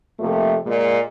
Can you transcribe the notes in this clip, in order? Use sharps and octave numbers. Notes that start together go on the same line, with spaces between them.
F2 C3 A3 A#3 F4
A#2 G#3